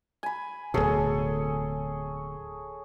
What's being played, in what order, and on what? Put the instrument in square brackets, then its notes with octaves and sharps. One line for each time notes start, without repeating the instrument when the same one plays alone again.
[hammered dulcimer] G#5 B5
[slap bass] D1 B2 [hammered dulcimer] G#4 A4 C#5